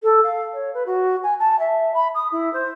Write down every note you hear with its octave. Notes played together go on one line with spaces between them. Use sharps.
A4
F5
C#5
B4
F#4
G#5
A5
E5
B5
D#6
E4
C5